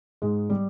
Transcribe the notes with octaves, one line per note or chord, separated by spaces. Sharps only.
G#2 G#3
G3